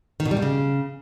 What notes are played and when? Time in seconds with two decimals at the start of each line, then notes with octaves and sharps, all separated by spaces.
0.20 D#3
0.25 B2
0.31 G3
0.37 B2
0.42 C#3